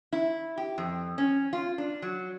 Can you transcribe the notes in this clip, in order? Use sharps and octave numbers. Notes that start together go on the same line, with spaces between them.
E4
G4
F2
C#4
F4
D4
F#3